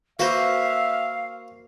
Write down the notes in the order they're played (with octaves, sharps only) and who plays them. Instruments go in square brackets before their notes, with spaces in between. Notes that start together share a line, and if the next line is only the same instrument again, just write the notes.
[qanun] A#3 C5 [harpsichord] F#4 B4 [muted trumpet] E5 [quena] F5